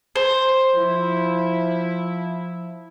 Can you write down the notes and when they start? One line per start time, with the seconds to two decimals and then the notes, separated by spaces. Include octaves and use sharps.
0.16 C5
0.74 F3 E4